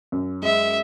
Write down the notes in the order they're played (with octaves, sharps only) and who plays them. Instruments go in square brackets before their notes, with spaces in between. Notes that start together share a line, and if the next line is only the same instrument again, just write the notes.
[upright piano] F#2
[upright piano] G#3 [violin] E5